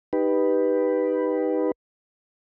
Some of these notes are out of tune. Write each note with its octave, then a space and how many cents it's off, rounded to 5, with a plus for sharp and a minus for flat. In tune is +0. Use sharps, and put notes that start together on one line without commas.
D#4 +0 G4 +5 B4 +0